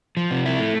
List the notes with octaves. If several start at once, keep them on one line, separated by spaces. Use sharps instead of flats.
F3
C3
E4
A3